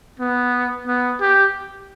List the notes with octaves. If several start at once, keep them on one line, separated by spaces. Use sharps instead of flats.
B3
B3
G4